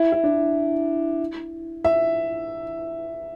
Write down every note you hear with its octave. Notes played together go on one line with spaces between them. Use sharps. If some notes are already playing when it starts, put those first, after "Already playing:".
Already playing: E4
E4
D4
E5